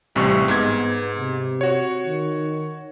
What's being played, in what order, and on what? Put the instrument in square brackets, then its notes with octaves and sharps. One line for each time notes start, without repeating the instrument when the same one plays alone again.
[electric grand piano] A1 C3 C#6 [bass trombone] G3
[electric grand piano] G#2 G#6 [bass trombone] B3
[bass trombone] C3
[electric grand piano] F#4 C#5
[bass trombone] D#3